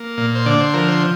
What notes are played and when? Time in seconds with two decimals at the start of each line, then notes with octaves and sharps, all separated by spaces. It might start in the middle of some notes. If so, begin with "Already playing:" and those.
Already playing: A#3
0.18 A#2
0.35 C5
0.46 D3 D5
0.60 C5
0.74 F3 A#4
0.88 C5